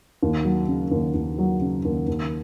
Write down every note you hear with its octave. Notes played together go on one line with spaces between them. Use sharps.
D#2
F#3
C#3
D#2
D#2
F#3
C#3
D#2
D#2